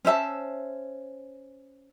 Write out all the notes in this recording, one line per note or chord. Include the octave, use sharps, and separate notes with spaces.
C#4 C5 E5 A5